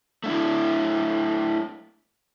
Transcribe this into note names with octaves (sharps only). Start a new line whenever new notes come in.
A3 D4 E4